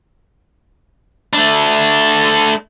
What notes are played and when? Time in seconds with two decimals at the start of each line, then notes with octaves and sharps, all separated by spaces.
1.33 A3 D4